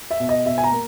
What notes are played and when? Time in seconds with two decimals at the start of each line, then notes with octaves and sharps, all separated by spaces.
0.11 E5
0.20 B2
0.29 D#5
0.46 B2 E5
0.58 G#5
0.64 A#5
0.72 A#3